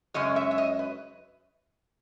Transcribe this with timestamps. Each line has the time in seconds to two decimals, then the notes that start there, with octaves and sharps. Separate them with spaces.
0.14 F#2 C#3 G#3 C#4 D#5
0.36 E5
0.51 E5
0.58 D#5
0.79 B4